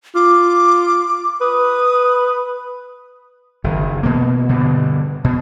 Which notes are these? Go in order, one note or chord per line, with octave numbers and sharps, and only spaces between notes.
F4 D6
B4 D#6
F#1 D#3
B2 A#3
G2 B2 D3
B2